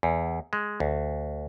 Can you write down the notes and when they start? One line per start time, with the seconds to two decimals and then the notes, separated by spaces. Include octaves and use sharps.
0.03 E2
0.53 G#3
0.80 D2